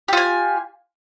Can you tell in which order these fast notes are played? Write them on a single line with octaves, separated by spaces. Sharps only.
G4 F4 G#5